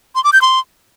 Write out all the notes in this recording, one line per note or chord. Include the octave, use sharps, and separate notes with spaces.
C6
D6
G6
C6